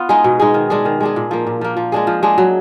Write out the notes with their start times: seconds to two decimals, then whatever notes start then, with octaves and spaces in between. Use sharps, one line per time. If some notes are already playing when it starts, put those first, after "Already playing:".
Already playing: B3 F4
0.09 G#3 D#4 G#4
0.24 B2
0.40 G#3 D#4 G#4
0.54 D#3
0.70 G#3 D4 G#4
0.85 D#3
1.01 G#3 D4 G#4
1.16 A#2
1.31 F3 A#3
1.47 A#2
1.61 F3 A#3
1.77 F3
1.92 G#3 D4 G#4
2.07 F3
2.23 G#3 D4 G#4
2.38 F#3